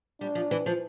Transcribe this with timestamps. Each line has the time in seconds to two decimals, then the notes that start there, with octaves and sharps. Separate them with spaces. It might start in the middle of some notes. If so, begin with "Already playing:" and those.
0.20 G3 D4
0.35 F3
0.51 E3
0.66 F3